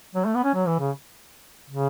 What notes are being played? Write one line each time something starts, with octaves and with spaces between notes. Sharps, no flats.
F#3
A3
B3
C#4
F#3
E3
C#3
C#3